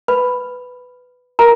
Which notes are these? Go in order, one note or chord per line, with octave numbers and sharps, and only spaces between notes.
B4 B5
F#4 A#4 A#5